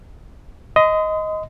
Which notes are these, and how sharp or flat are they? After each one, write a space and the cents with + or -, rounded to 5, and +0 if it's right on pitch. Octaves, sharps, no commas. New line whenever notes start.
D#5 +10 C6 -40